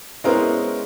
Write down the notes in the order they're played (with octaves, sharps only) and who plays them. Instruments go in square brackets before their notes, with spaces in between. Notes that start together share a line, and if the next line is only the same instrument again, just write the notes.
[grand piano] G#3 B3 C#4 E4 A#4 C5